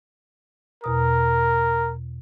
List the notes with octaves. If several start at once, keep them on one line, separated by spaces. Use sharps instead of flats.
E2 B2 A#4 D#6